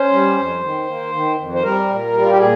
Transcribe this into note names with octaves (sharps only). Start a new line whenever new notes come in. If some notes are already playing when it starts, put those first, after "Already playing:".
Already playing: C#4 C5
G3
F2
D#3
A#3
D#3
F2
C5
G3 A#4
A#2
G3
F4
G4
A#2 G#4